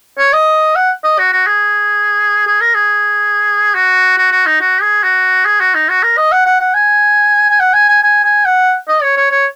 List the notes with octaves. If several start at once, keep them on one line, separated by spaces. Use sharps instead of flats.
C#5
D#5
F#5
D#5
F#4
F#4
G#4
G#4
A#4
G#4
F#4
F#4
F#4
D#4
F#4
G#4
F#4
G#4
F#4
D#4
F#4
A#4
D#5
F#5
F#5
F#5
G#5
G#5
F#5
G#5
G#5
G#5
G#5
F#5
D#5
C#5
C#5
C#5